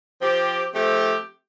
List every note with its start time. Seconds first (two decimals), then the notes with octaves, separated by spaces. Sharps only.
0.21 F3 C4 G4
0.73 F3 A3 C4 G4